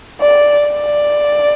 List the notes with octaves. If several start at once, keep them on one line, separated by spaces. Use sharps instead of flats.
D5
D5